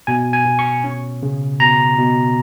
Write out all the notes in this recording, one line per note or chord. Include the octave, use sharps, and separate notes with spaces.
B2 G#5
G#5
B2
C#6
C#4
C#3
B2 A#5
B2